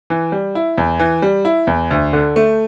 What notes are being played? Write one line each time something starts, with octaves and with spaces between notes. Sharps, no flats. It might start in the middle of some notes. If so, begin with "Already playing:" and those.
E3
G3
E4
E2
E3
G3
E4
E2
D2
D3
A3